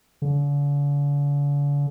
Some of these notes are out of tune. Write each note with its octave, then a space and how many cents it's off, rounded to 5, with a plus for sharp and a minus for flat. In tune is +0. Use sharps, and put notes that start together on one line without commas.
D3 -45